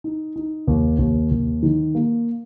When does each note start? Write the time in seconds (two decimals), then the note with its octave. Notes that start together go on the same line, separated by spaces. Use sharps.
0.04 D#4
0.36 D#4
0.67 D#2
0.99 D#2
1.31 D#2
1.63 D#3
1.95 A#3